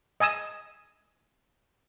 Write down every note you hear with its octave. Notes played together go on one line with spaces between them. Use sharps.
D#5 G#5 D#6 E6